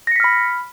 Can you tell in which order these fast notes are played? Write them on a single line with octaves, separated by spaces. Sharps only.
A#6 C#7 B6 F6 B5